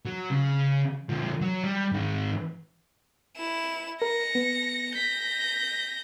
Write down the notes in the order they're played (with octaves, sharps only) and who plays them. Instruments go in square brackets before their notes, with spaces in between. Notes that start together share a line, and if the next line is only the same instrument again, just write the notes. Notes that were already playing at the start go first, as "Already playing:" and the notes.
[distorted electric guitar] F#3
C#3
D3 F3
F#3
G3
G#2 D#3
[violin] E4 E7
[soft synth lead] A#4 [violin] A#6 C#7
[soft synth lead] B3
[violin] G6 A#6 [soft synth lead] B6